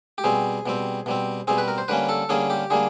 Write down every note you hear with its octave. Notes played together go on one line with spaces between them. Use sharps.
G4
B2 G3 C4 G#4
B2 G3 C4
B2 G3 C4
B2 G3 C4 G#4
B4
A#4
C5
D3 G3 A#3 C#4 B4
A4
D3 G3 A#3 C#4 G#4
G4
D3 G3 A#3 G#4